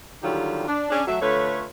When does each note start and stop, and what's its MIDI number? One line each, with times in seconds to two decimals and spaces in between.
0.22 0.67 50
0.22 0.67 51
0.22 0.67 54
0.22 0.67 55
0.22 0.67 65
0.22 0.67 67
0.68 0.87 62
0.91 1.02 61
0.91 1.02 62
0.91 1.02 68
1.07 1.17 54
1.07 1.17 57
1.07 1.17 76
1.22 1.65 50
1.22 1.65 57
1.22 1.65 65
1.22 1.65 71
1.22 1.65 73